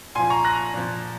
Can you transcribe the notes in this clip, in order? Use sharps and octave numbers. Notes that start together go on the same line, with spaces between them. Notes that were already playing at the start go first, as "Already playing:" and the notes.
A#2 F3 G#5 C6
A#5 C#6
F#6 A#6
A#2 F3